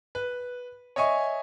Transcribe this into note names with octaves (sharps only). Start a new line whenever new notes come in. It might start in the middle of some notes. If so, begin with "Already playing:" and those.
B4
C#5 D#5 E5 G#5 C#6